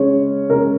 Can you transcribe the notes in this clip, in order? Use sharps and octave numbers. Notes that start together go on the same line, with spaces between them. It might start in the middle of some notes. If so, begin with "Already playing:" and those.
Already playing: C#3 G#3 C#4 C#5
C#3 G#3 C#4 A#4